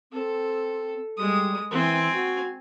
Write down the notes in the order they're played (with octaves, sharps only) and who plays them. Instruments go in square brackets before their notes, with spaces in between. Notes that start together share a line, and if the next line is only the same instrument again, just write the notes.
[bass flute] C4 [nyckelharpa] A4
[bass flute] G3 [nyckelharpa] G#3 D#6
[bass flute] E3 [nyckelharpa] C4 G#5
[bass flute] F#4